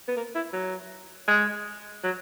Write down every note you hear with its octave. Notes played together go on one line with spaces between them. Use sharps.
B3
A#3
E4
F#3
G#3
F#3